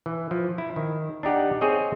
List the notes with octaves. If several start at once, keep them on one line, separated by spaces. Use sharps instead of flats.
E3
F3
E4
D#3
D4 D#4 G4 F#5
C4 G#4 C#5 D#5